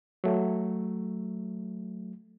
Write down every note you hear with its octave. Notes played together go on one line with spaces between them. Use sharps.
F#3 A3